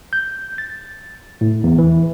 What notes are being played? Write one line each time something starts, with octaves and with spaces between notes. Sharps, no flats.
G6
A6
A2
E2
E3